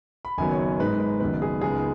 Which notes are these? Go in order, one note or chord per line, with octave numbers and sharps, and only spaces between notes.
B5
F#1 F#2 D#3 F#3 B3 G#5
C#5
G#2 G#3 D#4 B4
B4
F#1 F#2 D#3 B3 B4
G#4
C#2 C#3 G#3 B3 D#4 G#4